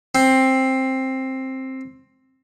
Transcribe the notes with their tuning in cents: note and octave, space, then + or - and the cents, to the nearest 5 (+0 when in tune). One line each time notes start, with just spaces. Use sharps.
C4 +10